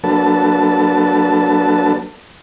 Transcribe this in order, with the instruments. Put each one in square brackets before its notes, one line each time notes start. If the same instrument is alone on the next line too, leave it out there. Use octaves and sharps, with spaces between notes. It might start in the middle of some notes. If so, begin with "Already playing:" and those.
[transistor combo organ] F#3 A#3 D4 A4 B4 A5